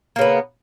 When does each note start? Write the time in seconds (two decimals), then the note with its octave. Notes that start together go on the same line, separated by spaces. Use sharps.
0.16 A#3
0.19 C#3
0.21 B3